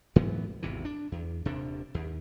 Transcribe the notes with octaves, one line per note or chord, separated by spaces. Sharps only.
G#2 E3 F#3 B3
G#1 E2 C3 E3
D4
E2
D#1 C3 D4
D#2